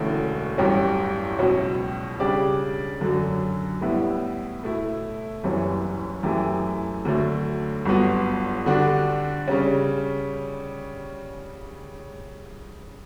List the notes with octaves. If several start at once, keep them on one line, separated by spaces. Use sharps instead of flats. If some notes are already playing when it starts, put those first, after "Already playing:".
Already playing: E1 E2 D3 A3 C#4
A1 G2 F#3 C#4 G4
C#2 B2 F#3 C#4
C#3 G3 D4 G4 D5
F#2 D3 F#3
A2 G3 B3 E4
B2 A3 E4
F#1 F#2 E3 G3 C#4
F#2 E3 A3 E4 G4
D2 D3 F#3 A3
G1 G2 F#3 B3
D3 G3 D4 F#4
C#3 G3 C#4